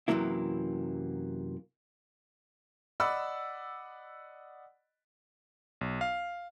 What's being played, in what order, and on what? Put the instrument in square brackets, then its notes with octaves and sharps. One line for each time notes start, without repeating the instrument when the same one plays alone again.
[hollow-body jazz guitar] F#2 C3 E3 F#3 A#3 E4
[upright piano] D5 D#5 F#5 B5 E6
[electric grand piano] B1
F5